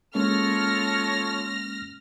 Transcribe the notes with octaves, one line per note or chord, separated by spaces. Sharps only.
G#3 A#3 C#4 F4 A4 C#5 F6 A#6